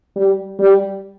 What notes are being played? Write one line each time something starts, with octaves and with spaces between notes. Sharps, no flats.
G3
G3